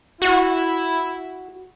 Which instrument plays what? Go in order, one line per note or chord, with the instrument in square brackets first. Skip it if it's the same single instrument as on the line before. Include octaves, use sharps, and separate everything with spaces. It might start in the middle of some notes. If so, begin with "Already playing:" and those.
[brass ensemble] E4 [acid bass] F#4